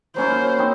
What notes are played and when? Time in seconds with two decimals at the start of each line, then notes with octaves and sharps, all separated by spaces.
0.16 F#3 A#3 C#4 E4 C5
0.59 C4 D#4